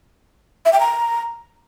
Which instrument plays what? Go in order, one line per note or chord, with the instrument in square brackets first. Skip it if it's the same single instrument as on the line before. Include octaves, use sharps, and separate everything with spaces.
[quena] E5
G5
A#5